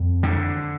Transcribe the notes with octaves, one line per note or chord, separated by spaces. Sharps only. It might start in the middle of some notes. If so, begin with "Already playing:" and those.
Already playing: F2
D3